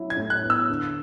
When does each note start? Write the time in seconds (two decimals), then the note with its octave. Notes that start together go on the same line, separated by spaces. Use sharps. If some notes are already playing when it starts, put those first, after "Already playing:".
Already playing: F#3 E4
0.10 G#6
0.16 A2
0.30 F#6
0.43 B3
0.50 E6
0.70 D3